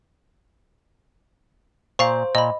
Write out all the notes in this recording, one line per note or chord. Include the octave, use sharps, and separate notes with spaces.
A#2 C5 F5 A#5 C#6
A#2 D#5 B5